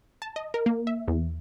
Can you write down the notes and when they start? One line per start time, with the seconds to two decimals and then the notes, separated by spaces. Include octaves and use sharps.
0.22 A5
0.36 D#5
0.54 A#4
0.66 A#3
0.87 E5
1.08 E2